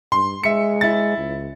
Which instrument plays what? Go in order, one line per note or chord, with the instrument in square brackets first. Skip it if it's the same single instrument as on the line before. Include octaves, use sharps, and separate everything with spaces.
[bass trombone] G2 [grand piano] C6
[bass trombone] G#3 [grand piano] E5 C#7
[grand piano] E4 A6
[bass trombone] C#2